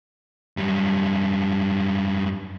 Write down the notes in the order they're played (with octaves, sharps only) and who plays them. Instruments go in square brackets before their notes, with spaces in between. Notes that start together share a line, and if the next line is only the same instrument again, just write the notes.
[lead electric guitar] F#2 G3